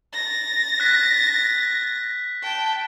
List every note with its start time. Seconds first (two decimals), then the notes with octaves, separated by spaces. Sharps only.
0.13 A6 A#6
0.80 F#6 B6
2.42 G5 A5